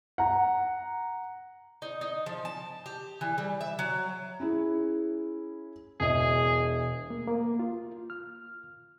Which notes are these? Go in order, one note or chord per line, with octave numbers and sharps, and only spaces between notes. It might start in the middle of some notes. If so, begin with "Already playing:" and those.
F#5 A#5
D#4
D#4
F3
A5
G4
E3
G3
E5
F#3
C#4 E4 G#4
E1 G#4 D#5 E5
A#3
A#3
F4
F6